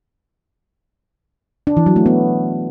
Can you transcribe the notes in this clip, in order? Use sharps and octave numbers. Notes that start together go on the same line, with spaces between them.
D4
E3
F#3
A3
B3